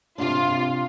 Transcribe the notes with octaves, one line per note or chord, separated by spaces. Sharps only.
C3 D4 F4